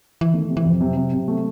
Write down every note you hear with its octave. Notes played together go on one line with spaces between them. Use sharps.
E3
D#3 A3
E3
C3
E3
F2 F3
C3 F#3
C3
C3
A3